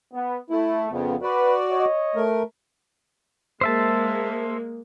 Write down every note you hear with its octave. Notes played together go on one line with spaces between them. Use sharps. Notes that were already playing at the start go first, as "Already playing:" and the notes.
B3
A3 E4
F2 C#3 B3
F#4 B4 D5
C#5 D#5
A3 A#4
G#3 A#3 C5 E5 A5